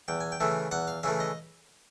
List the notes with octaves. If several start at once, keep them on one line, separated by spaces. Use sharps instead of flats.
E2 G5
G#5
G5
C#3 E3 A3
E2 F#5
F5
C#3 E3 A3 E5
D#5